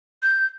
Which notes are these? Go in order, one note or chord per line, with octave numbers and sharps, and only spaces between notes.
G6